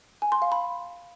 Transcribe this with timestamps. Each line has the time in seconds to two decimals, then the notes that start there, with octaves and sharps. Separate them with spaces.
0.22 G#5
0.32 C6
0.42 F5
0.52 B5